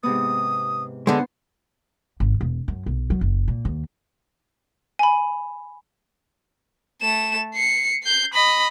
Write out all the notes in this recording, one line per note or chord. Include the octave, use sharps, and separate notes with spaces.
G#2 C3 B3 D#6
D3 G#3 B3 C5 F#5 C6
G#1
E1
F#2
B1
F#3
F#1
A#2
D#2
G#5 B5
A3 E7
C7 C#7
G6 C7
D#5 B5